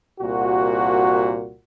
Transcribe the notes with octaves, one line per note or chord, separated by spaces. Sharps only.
C2 A#2 F#4